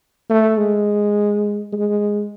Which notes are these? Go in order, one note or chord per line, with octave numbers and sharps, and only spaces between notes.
A3
G#3
G#3